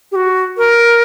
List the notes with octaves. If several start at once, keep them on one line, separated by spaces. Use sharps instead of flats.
G4
F#4
A#4